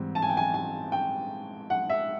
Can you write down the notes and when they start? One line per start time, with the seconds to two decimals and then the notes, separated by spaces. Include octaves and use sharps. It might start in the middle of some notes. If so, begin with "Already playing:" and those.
Already playing: G#2 E3 G3 C4
0.15 A5
0.22 G#5
0.29 G5
0.37 G#5
0.54 G#5
0.92 G5
1.70 F#5
1.90 E5